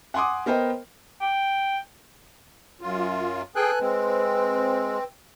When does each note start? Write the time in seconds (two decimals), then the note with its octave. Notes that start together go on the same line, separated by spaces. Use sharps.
0.14 F#5 G#5 C6 D6 D#6
0.46 B3 A#4 C5 D#5 G5
1.21 G5
2.81 F#2 F4
3.55 G#4 A4 B4 G5 G#5 F#6
3.80 G#3 C4